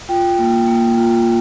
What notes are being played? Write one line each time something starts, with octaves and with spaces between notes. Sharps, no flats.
F4 G5
A#3
A#3
F4